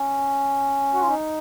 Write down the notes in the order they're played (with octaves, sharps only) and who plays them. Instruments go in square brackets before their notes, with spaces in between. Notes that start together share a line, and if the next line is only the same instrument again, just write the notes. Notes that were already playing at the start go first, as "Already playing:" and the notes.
Already playing: [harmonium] C#4
F#4
F4
D#4